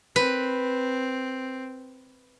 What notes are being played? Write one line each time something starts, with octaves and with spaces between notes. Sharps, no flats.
C4 B4